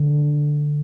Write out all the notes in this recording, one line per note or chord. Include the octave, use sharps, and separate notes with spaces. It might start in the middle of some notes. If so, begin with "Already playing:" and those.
Already playing: D3